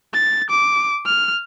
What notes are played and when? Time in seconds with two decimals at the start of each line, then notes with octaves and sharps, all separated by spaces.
0.14 A6
0.50 D6
1.06 F6